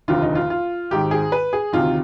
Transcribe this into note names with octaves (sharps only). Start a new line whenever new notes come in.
F1 D#2 D3 F4
D#4
F4
F4
G#1 G#2 D#3 G4
G#4
B4
G#4
D2 C3 D#3 F4